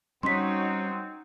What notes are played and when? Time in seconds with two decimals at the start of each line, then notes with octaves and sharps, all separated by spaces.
0.23 G3 C4 C#4 D#4 F#4 C#5 C6 B6